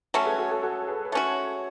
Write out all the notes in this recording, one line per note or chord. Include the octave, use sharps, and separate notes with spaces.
F#3 A3 C#4 A4 C#5
G#4 B4
F#4 A4
F#4 A4
F#4 A4
G#4 B4
B4
A3 C#4 F#4 A4 C#5